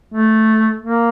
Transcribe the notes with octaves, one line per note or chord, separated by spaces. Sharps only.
A3
A#3